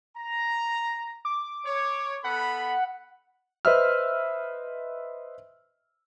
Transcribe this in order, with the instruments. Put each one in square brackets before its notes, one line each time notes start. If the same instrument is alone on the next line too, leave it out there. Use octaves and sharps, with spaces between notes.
[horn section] A#5
[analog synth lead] D6
[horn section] C#5
[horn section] B3 A4 B5 [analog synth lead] F#5
[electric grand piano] B4 C5 D#5 E5 E6 F6